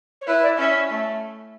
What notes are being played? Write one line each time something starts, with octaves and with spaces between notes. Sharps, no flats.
C#5
E4 B4
D5
C#4 E5
A3